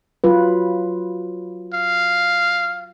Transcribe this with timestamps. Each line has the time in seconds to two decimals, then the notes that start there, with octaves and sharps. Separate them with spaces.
0.24 F#3 F4 B4
1.74 F5